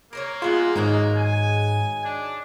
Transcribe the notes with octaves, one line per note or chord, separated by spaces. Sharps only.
A#3 A#4 C5 C#5
G#3 B3 F4 F5 F#5
G#2 D#3 F#3 G#3 A#3
G#5
D4